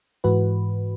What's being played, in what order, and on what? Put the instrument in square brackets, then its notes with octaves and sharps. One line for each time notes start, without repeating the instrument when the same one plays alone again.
[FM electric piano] G#2 E3 F#4 B4